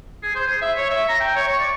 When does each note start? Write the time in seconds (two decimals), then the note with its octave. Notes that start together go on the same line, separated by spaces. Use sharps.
0.23 G#4
0.35 C5
0.47 G#4
0.62 E5
0.77 C#5
0.90 E5
1.09 A#5
1.20 G5
1.36 C#5
1.48 C#6
1.60 D5